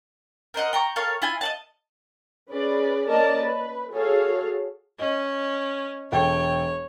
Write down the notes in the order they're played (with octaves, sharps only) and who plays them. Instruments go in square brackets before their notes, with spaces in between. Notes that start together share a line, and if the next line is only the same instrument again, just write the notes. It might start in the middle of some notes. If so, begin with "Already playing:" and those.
[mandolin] A#4 C5 D#5 F#5
G5 A#5 C#6
A4 A#4 C#5 F5
E4 F4 G#5
D#5 F#5 A5
[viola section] C#4 G#4 B4 D5
A#3 C#4 A#4 D5 D#5 A5
B4
F#4 G#4 A4 C#5 F5
[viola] C#4 [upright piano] D#5
[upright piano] E1 A4 G5 [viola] C#5